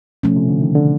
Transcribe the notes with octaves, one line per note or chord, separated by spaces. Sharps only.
B2 F3 A3 C#4
C3
D3
D#3
D3